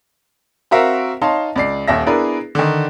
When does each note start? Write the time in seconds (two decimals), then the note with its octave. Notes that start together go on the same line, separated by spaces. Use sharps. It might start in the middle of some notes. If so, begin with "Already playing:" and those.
0.71 C4 F#4 A#4 E5 F5
1.22 D#4 C#5 F5 A5 C6
1.56 C#2 D5 C7
1.88 D#1 D#2 E5 A#6
2.06 B3 D4 E4 G#4 A#4 B4
2.55 D3 D#3